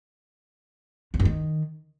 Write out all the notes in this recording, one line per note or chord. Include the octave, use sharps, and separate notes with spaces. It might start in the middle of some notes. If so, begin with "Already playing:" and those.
E2
F#2
D#3